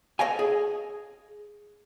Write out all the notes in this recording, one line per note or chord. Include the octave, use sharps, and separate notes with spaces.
A4 C#5 D#5 F5 G5 G#5
G#4